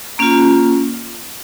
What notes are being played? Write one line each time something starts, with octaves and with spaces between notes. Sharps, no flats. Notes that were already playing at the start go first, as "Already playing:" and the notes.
A#3 C#4 F4 A#5